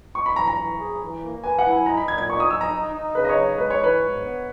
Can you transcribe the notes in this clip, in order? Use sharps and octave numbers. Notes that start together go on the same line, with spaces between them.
D#4 C#6
B5
E3 A#5
A#5
E3
G#4
E3
A#3
B4 G#5
F#5
E4
G#5
D#4 A#5
B5
A#2 G#6
G#6
D#4 C#6
D#6
D#4 E6
A#5
D#4
D#4
C#3 B4
D#5
C#5
D#4
G#3 B4
C#5
E3 B4
G#2
B3